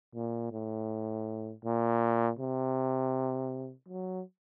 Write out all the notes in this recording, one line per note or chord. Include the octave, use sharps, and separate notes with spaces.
A#2
A2
A#2
C3
F#3